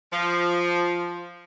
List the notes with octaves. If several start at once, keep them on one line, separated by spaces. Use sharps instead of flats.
F3